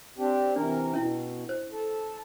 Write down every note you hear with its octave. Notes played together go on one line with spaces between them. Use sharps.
C4 D4 G4
C3 E3 D4 A#4
B2 C#4 E4
C5
A4